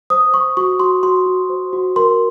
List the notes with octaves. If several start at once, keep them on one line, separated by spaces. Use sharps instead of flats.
C5 D#6
C5 C#6
F#4 C#6
F#4 C6
F#4 C6
F#4
C5
F#4
A#4 C6